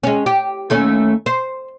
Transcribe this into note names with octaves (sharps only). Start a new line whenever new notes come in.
G#3 C#4
G4
D#2 A3 C#4
C5